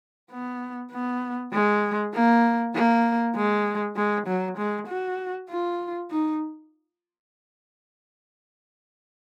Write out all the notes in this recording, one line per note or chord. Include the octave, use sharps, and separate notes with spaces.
B3
B3
G#3
A#3
A#3
G#3
G#3
F#3
G#3
F#4
F4
D#4